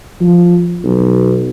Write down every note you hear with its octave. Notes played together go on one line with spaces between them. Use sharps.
F3
B1